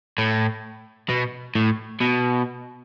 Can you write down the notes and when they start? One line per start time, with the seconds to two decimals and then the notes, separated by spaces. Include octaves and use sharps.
0.18 A2
1.09 B2
1.55 A2
2.01 B2